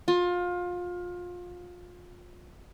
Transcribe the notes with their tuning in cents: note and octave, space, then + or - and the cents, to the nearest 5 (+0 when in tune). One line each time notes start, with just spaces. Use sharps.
F4 +25